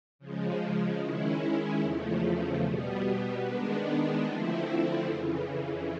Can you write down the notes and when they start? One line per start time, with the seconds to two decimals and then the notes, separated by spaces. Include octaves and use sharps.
0.19 C#3 F3 G#3
0.99 D#3 G#3 C#4 E4
1.81 E2 C#3 F3 A3
2.62 B2 G3 B3
3.43 D#3 G#3 B3 D4
4.24 D3 F3 A3 C4 E4
5.05 F2 C#3 E3